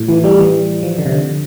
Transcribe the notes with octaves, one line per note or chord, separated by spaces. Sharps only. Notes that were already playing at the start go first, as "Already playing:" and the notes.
Already playing: A2
E3
G3
E3
F3
D3
C3
D3